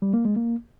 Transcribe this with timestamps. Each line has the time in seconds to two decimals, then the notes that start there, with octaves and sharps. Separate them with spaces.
0.02 G3
0.13 A#3
0.25 G#3
0.36 A#3